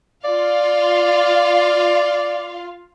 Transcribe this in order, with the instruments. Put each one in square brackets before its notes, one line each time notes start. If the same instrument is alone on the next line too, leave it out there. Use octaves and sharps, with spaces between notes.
[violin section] F4 F5 [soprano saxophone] D5